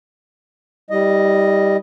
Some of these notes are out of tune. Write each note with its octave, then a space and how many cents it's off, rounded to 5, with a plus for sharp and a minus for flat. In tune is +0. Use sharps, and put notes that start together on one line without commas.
G3 +5 E4 -40 D#5 +0